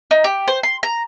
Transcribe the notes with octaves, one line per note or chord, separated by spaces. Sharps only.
D#4
G4
C5
C6
A#5